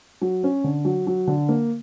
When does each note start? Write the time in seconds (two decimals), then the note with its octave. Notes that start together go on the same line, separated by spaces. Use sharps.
0.22 F#3
0.44 C#4
0.64 D3
0.85 F#3
1.07 F#3
1.27 D3
1.49 A#3